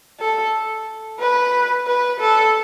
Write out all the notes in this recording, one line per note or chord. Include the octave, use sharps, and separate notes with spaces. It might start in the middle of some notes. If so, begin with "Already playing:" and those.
A4
B4
B4
A4